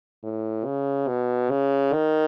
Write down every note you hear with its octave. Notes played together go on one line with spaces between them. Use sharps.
A2
C#3
B2
C#3
D#3